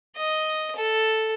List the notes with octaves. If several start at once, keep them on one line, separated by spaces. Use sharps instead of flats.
D#5
A4